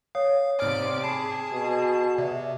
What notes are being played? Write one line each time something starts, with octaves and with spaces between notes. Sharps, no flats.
C#5 F5 D#6
G#2 C3 D5 D6 F6
G#4 A5 B5 C7
B2
C3 D5 E5